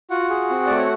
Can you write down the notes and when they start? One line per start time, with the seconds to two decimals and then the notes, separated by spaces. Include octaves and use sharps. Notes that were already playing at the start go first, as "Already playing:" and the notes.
0.10 F4 F#4 F#5
0.30 G#4
0.50 C4
0.67 A3 D5
0.78 C#5